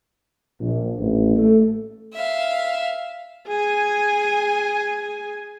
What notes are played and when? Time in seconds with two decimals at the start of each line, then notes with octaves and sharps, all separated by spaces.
0.60 A#1
0.98 A1
1.36 A3
2.13 E5 F5
3.48 G#4 G#5